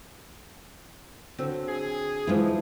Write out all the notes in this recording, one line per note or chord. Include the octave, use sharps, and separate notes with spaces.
D3 F#3 C4
G#4
E3 F3 G#3 D#4